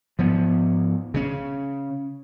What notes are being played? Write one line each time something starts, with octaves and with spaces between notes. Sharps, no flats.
G#2 F3 B3
C#3 F#3 C#4